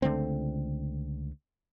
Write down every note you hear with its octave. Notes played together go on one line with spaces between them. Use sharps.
C#2 D3 A3 C4